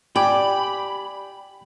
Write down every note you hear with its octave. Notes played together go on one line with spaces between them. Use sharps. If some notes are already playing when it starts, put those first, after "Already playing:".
G4 D5 G5 G#5 B5 D6